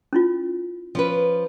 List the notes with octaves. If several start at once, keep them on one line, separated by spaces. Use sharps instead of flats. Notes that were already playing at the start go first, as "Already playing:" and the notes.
C#4 E4 F4
F3 C#4 B4